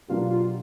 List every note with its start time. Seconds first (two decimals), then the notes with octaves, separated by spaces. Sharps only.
0.08 B2 F#3 A#3 D4 F4 G4
0.30 F4